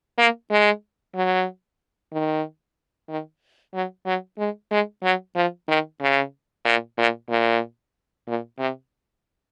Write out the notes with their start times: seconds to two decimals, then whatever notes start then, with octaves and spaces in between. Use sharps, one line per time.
0.18 A#3
0.51 G#3
1.15 F#3
2.13 D#3
3.09 D#3
3.74 F#3
4.06 F#3
4.39 G#3
4.71 G#3
5.03 F#3
5.36 F3
5.69 D#3
6.01 C#3
6.65 A#2
6.98 A#2
7.29 A#2
8.28 A#2
8.59 C3